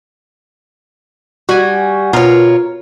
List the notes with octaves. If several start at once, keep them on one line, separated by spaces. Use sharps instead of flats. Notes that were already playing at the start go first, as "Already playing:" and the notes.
G3 F#4 G#5
B2 F4 A#4 C#5